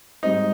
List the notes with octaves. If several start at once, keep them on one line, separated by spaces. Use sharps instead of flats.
G#2 G3 C4 D#4